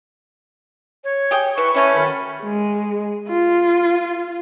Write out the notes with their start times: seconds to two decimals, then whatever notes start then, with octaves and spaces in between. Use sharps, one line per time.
1.04 C#5
1.31 G4 G#4 G5
1.58 E3 B4 C#6
1.75 E3 A3 C#4 C#5
1.95 F#2 D#3 B5
2.42 G#3
3.28 F4